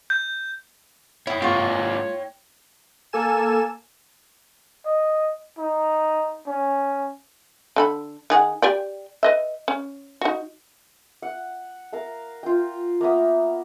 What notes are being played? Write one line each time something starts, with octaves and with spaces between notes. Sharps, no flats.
G6
E4 C#5 G5 D#6
G#2 A#3 F4 C#6
A#3 A4 G#5 E7
D#5
D#4
C#4
D3 A4 B5
D#3 G#4 F#5
G4 D5 G5
B4 D#5 E5
C#4
D#4 F#4
F#5
A#4 F5 A#5
F4 G5
A#3 B3 E5 D#6